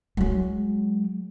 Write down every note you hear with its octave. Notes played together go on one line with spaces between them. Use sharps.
F#3 G#3